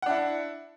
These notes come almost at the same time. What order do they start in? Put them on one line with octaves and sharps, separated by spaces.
F#5 D4 E4